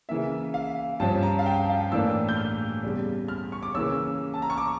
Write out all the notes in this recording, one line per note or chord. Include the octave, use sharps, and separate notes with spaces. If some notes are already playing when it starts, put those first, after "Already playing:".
C#3 E3 A#3 E5
F5
G2 F3 C#4 A5
A#5
F5
G5
F5
A2 E3 A#3 D4 E6
G6
F6
E2 C#3 G3
F6
C#6
D6
C#3 E3 A#3 C#4 E6
A5
A#5
C#6
D6